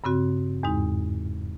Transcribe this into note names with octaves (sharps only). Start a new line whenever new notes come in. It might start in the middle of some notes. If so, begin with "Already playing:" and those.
G2 C#3 C4 F#4
E2 G#2 G#3 D#4